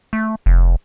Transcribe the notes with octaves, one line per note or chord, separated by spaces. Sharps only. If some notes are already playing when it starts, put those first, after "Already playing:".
A3
F1